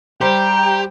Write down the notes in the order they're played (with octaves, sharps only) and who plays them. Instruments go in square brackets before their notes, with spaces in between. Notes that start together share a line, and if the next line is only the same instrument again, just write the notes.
[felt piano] G3 C5 [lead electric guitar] G4 [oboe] G5 [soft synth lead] A#5